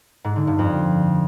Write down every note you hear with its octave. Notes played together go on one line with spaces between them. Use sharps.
G#2
D3
G2
F2